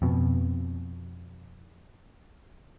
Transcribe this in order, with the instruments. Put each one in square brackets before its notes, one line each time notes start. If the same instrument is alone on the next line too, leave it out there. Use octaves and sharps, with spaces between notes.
[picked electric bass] F2 B2